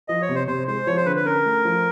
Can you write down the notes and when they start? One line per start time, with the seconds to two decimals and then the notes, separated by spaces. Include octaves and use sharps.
0.08 F3 D#5
0.22 C#5
0.29 C3
0.35 C5
0.47 C3 C5
0.68 G#3 C5
0.87 F3 C#5
0.97 C5
1.06 D3 B4
1.16 B4
1.25 C#4 A#4
1.46 A3
1.65 F3